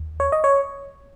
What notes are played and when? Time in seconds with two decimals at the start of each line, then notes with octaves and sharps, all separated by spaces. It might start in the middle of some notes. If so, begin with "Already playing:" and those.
Already playing: D#2
0.20 C#5
0.32 D#5
0.44 C#5